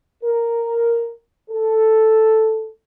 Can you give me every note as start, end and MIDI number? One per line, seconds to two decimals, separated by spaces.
0.23 1.11 70
1.50 2.70 69